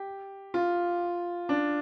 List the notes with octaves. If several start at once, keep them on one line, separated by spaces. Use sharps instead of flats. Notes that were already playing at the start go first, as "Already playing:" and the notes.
Already playing: G4
F4
D4